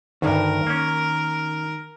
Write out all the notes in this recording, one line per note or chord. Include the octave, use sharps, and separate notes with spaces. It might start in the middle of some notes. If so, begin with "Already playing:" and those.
D2 G2 D#3 A#4
A#3 C#4